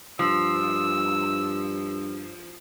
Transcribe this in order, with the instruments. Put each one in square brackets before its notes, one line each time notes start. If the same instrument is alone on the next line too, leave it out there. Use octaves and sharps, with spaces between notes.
[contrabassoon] G2 [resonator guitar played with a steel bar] F3 [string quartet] E6